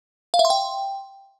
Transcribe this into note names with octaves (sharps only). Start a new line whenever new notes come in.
F5
E5
C6
G5